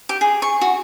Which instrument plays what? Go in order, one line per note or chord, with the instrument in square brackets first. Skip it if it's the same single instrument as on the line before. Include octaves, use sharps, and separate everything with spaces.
[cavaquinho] G4
G#4
C#6
F#4